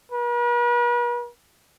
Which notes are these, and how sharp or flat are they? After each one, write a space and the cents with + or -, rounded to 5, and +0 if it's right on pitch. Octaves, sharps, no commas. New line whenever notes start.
B4 -45